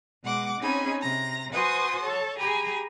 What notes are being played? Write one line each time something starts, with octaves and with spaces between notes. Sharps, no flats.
B2 G#3 F#5 D6
C4 C#4 D#4 G#4 G#5 B5
C3 A#5 A#6
F#4 B4 C5 G#5 C6 D#6
A4 C#5 A5
G4 G#4 G#5 A#5 B5